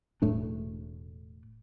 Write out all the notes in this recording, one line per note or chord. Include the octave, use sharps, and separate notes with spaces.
E1 A2 A3 D4